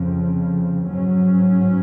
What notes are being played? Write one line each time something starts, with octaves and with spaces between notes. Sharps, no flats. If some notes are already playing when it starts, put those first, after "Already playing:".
Already playing: F2 C#3 F3
G#2 F#3 C#4